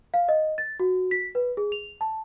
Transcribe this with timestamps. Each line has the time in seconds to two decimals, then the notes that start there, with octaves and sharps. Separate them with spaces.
0.14 F5
0.29 D#5
0.58 A6
0.80 F#4
1.11 B6
1.35 B4
1.57 G#4
1.72 F7
2.01 A5